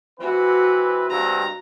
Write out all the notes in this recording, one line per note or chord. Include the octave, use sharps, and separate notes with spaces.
E3 C4 F#4 B4
G2 B2 C4 A#5